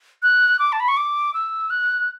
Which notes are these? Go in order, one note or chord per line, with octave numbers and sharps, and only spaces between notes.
F#6
D6
A5
B5
C#6
D6
E6
F#6